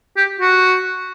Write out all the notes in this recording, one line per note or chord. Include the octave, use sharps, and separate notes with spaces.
G4
F#4